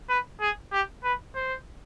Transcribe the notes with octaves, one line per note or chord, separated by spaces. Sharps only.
B4
G#4
G4
B4
C5